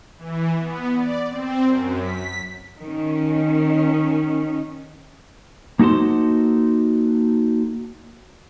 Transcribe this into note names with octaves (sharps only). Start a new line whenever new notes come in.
E3
B3
D5
C4
F#2
B6
D#3 C#4
A#3 D#4 F#4 A4 C5